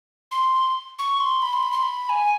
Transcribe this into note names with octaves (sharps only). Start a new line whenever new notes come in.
C6
C#6
C6
B5
C6
B5
C6
B5
G#5